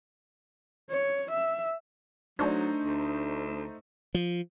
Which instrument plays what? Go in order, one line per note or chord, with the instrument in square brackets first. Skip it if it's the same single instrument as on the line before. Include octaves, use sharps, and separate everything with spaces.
[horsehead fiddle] C#5
E5
[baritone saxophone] F#3 [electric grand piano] A3 D#4 C5 [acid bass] D4
[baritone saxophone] D2
[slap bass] F3